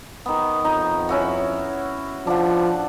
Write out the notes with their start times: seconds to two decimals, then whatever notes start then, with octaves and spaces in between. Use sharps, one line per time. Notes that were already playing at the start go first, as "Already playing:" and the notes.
0.26 D#3 B3
0.64 F2 D#4
1.09 C#4 E4 F#4
2.27 F3 D4 F#5